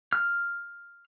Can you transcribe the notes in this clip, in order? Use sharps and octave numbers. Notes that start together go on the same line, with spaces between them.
F6